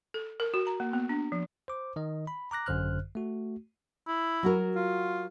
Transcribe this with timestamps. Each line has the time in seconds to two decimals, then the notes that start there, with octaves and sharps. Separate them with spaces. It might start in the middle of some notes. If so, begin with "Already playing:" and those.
0.14 A4
0.40 A#4
0.54 F#4
0.67 A#5
0.80 A#3
0.93 B3
1.09 D4
1.32 F3
1.68 C5 D6
1.96 D#3 D#5
2.27 B5
2.51 A#5 D6 F#6 A#6
2.66 G#1 F#2 D3 C5 F6 F#6
3.15 A3 F#4
4.07 E4
4.43 F#3 F#4 A#4
4.75 F4